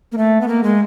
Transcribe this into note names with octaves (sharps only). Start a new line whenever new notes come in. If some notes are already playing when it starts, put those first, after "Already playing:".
A#3
A3
B3
A#3
G#3